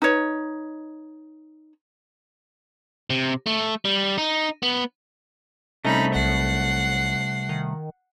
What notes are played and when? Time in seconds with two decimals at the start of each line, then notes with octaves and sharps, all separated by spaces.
0.02 D#4 B4 C#5
3.10 C3
3.46 A3
3.85 G3
4.18 D#4
4.63 B3
5.85 C2 A3 C#4 D#4 B5
6.15 B1 F#5 C7
7.49 D#3